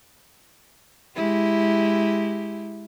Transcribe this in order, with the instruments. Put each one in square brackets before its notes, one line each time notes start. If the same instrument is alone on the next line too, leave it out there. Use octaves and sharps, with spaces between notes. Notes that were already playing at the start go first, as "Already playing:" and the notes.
[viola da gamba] G#3 E4 G4